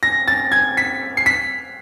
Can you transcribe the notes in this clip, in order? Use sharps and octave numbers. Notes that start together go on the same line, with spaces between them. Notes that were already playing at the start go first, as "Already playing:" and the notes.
A#6
A6
G#6
B6
C7
B6